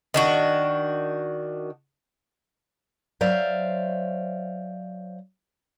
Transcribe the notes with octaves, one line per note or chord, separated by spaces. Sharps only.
D#3 D4 F#4
F#3 C5 D5 E5 F5